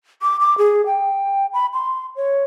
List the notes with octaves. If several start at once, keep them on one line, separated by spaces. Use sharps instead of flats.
D6
D6
G#4
G5
B5
C6
C#5